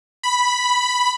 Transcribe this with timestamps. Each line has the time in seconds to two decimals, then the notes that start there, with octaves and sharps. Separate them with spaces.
0.23 B5